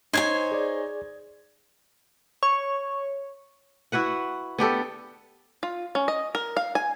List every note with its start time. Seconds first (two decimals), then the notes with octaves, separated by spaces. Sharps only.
0.13 D#4 C5 C#5 G#5 G#6
0.52 G#4 D5
2.43 C#5
3.92 E4 F#4 B4 F#5
4.58 B3 D4 G4 A4
5.63 F4
5.95 C#4
6.08 D#5
6.35 A#4
6.57 F5
6.75 G#5